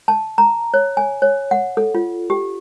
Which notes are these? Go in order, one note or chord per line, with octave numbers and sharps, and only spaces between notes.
A5
A#5
C#5
G#5
C#5
F#5
A4
F4
G4